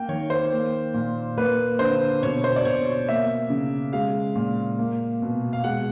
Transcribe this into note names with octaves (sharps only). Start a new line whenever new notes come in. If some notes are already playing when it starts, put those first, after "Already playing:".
Already playing: A#3 G5
D#3 C#5
C5
A#3
A#2
A#3 B4
D3 C5
B2 C#5
C5
D5
B2 C#5
A#3 E5
C#3
G#3 F5
A#2
A#3
B2
F5
G#3 F#5